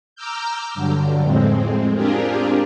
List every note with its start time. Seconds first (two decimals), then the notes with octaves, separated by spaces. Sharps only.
0.16 A#5 D6 E6 F6 G6
0.75 G2 D3 F#3
1.21 F2 A2 G#3 C4
1.95 C4 D4 F4 G4 G#4 A#4